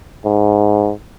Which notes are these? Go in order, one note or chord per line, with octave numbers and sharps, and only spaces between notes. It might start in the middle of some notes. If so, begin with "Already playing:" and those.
G#2